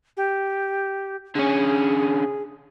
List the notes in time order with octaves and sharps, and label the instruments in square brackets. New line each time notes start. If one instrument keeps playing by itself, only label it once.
[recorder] G4
[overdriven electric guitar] D3 C#4 [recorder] G#4